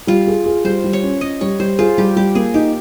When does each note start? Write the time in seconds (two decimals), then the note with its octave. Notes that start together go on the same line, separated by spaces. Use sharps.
0.07 G3 F4
0.27 G#4
0.46 G#4
0.64 G3 C5
0.84 G3
0.93 C#5
1.03 C#4
1.21 C#4 D#5
1.41 G3 C#5
1.60 G3 C5
1.79 F4 G#4
1.98 G3 G4
2.16 G3 G4
2.35 A#3 G#4
2.54 D#4 G4